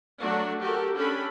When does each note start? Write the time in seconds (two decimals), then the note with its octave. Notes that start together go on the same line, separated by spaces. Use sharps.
0.18 F#3 A3 D4 F#4
0.61 F#4 G4 A4 A#4
0.96 C#4 D4 G4 A4 B5